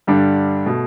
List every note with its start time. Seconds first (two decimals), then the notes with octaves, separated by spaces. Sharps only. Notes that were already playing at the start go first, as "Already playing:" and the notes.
0.07 G2 D3 G3 D4
0.66 B2 A3